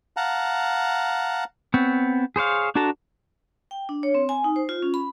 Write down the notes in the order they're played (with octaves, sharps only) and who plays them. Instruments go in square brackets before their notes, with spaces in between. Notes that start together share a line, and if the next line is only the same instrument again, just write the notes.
[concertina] F5 F#5 A5 A#5
[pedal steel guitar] B3 C4 C#5
G#4 C5 C#5 F5
D4 F#4 A4 A5 A#5
[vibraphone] G5
D4
C#5
C4
G#5
D#4
C5
F4
C#4
B5